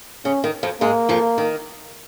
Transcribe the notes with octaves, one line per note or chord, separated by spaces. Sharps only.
C#3 C#4
D#3
F2 F3
G#2 G#3 A#3
F2 F3
D#3